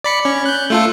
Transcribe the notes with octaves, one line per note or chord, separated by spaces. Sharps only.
D5 B5 C#7
C#4
F#6 G6
A3 F4 A4